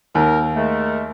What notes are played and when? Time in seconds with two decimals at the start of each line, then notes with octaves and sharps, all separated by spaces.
0.15 D#2 A#4
0.55 G#3 A3 A#4